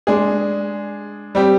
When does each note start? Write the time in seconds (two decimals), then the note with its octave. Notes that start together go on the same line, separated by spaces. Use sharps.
0.07 G#3 D4 G#4
1.35 G3 C4 G4